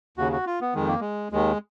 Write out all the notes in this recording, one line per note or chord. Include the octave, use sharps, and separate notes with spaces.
D#2 C#3 F#4
F#4
F4
B3
F2 D#3 G#3
A#3
G#3
D#2 D#3 G#3